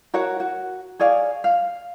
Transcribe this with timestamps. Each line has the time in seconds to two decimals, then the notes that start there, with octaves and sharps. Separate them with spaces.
0.14 F#4 A#4 C#5 F#5
0.40 F#4
0.99 G#4 C#5 D5 F5
1.44 F5